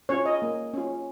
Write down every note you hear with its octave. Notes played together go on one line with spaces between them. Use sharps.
C#4 F4 C#5
D#5
A#3
C#4 F4